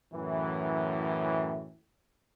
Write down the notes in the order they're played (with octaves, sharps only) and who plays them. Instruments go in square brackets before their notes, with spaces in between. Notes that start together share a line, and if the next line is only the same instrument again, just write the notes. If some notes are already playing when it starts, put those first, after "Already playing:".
[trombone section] F#2 A2 E3